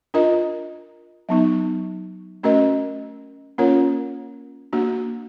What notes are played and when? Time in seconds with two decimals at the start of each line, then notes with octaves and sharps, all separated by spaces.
0.14 D4 F4 A#4 D#5
1.29 F#3 B3 D#4
2.43 A3 C#4 F#4 A#4 D#5
3.58 A#3 C#4 F4 A#4 C#5
4.73 A#3 D4 F#4